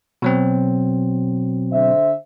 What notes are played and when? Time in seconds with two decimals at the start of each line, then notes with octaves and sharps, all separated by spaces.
0.22 B2 F#3 C4
1.72 D3 C5 E5